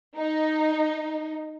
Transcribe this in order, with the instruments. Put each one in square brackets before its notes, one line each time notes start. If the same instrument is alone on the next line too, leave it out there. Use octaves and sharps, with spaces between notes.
[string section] D#4